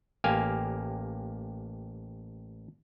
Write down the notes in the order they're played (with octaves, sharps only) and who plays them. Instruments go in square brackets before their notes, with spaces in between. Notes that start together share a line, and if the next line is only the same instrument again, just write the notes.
[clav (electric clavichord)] A1 A#3 G4 F5 G#5